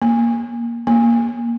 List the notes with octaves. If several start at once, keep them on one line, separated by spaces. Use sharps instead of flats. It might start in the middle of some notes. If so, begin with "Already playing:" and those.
A#3
A#3